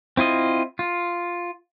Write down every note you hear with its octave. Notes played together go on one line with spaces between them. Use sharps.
C4 E4 F4 D#5
F4